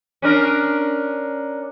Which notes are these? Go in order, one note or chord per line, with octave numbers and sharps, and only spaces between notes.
C#4 D4 A#4